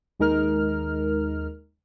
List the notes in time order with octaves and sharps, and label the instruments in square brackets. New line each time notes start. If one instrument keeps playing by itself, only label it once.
[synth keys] D#2 G#3 D#4 A#4 F6